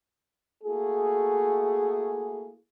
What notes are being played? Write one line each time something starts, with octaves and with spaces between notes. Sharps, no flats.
A3 A#3 E4 F#4 G#4